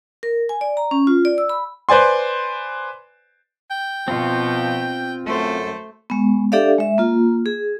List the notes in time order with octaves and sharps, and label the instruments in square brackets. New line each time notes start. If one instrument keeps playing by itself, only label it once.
[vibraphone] A#4
G#5
D5
A#5
C#4
F4
D5
E6
B5
[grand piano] B4 C5 D5 G#5 C6
[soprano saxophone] G5
[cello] B2 [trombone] F3 [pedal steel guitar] C4 F4
[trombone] F#2 [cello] A3 C5 [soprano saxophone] A4
[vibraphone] G#3 B3
D4 G4 A4 D5 E5 F5
G#3 E5
A#3 F4
G#4